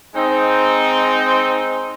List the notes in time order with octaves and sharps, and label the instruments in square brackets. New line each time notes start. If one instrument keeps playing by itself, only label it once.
[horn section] G#3 C4 D#4